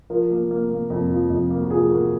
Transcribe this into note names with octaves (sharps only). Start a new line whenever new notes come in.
F3 A#4
A#3
A#3
A#3
F2
F3
F2
A#3
F#4
F3 G#4
A#3 F#4